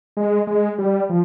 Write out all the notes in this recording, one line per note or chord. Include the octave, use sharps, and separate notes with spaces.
G#3
G#3
G3
F3